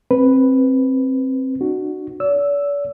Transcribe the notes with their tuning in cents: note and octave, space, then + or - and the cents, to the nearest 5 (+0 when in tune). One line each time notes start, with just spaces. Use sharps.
C4 +15 B4 +0
D4 +40 F#4 +0
D5 -45 E6 +0